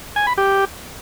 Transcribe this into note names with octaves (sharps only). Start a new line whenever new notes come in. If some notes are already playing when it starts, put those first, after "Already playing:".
G#5
B5
G4